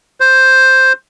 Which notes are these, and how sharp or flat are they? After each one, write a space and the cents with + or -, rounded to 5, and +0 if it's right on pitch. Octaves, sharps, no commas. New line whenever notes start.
C5 +5